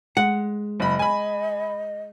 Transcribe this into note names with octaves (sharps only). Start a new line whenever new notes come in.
G#3 F#5
F#1 D#5 B5
G#5 B5